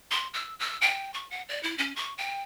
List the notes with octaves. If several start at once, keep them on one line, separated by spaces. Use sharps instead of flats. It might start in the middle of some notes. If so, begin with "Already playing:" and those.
C6
E6
E6
G5
C#6
F#5
D5
E4
C#4
C#6
G5